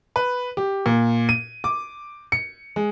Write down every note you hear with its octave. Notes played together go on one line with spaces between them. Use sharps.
B4
G4
A#2
D#7
D6
C#7
G#3